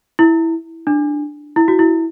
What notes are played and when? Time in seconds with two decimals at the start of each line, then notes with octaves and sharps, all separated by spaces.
0.19 E4
0.87 D4
1.56 E4
1.68 F#4
1.79 E4